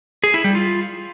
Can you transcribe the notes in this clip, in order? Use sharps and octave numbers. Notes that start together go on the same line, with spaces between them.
G#4
E4
G3
F4